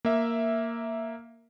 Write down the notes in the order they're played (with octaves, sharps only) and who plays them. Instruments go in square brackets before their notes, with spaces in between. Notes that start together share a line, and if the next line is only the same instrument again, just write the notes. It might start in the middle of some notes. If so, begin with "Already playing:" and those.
[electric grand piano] A#3 E5